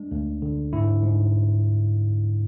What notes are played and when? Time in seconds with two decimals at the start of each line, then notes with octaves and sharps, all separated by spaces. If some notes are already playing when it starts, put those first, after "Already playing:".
Already playing: G#3 D4
0.11 D2
0.42 D3
0.73 G#2 E4
1.03 G#2